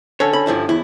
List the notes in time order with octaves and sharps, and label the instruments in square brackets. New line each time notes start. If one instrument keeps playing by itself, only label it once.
[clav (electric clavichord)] D3 C#4 A4 [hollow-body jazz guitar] C#5
[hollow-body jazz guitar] B5
G2 F3 E4
[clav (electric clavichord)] E2 [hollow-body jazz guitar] E4